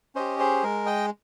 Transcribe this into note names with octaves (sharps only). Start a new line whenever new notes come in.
C#4 G4 C5 D#5
G#4 C5
G#3 A#4
D#5 G5